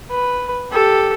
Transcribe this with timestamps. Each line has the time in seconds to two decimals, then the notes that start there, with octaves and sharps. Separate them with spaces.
0.11 B4
0.71 G4 A4